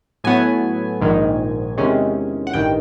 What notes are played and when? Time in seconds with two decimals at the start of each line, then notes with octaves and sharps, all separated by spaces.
0.24 A2 F#3 B3 G#5
1.01 A#1 G#2 D#3
1.78 E2 C3 D#3 G#3 C#4
2.47 F#5
2.53 A1 G2 D#3 G5